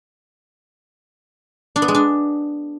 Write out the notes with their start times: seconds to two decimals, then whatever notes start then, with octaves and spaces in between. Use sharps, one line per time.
1.76 D4
1.82 B3
1.88 G#3
1.95 D4